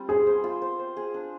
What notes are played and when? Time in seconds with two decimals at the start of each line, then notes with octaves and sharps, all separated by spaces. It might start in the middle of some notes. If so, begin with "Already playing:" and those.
Already playing: G3 C4 F4
0.09 G#4 C5
0.27 C5
0.44 F4
0.62 C5
0.79 C5
0.97 G#4
1.14 D4